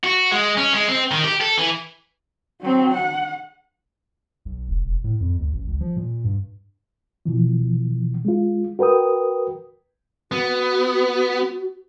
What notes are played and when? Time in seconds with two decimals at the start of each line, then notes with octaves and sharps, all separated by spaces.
0.03 F#4
0.31 G#3
0.57 C#4
0.73 G#3
0.89 C4
1.11 D#3
1.24 G4
1.41 A4
1.58 E3
2.61 F#3 C4
2.94 F#5
4.45 B1
4.69 E1
4.84 E1
5.04 A2
5.20 F2
5.39 D2
5.53 A1
5.67 C#2
5.81 F3
5.97 A#2
6.24 G2
7.26 B2 E3 F3
8.25 G#3 F4
8.79 F#4 A#4 B4 G5 D#6
10.32 B3 F#4